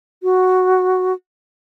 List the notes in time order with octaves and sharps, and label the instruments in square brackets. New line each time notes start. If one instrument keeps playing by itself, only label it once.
[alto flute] F#4